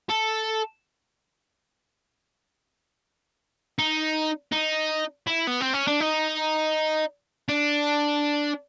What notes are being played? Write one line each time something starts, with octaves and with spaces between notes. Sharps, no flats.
A4
D#4
D#4
E4
B3
C4
C#4
D4
D#4
D4